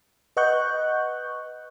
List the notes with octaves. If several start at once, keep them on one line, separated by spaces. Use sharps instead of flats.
B4 D#5 F#5 C#6 F#6 G6